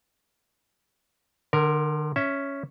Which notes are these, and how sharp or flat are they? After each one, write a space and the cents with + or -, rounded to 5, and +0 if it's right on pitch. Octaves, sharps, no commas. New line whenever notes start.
D3 +35 A#4 +0
C#4 +0 E5 +0